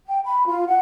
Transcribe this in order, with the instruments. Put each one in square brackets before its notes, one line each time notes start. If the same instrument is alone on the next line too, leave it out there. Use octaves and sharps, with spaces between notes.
[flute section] G5
B5
F4
F#5